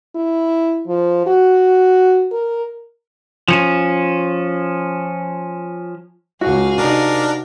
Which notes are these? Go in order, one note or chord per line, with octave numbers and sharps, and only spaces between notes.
E4
F3
F#4
A#4
F3 C#4
C#2 A2 F#4 G#4 F5
C3 D4 D#4 A#4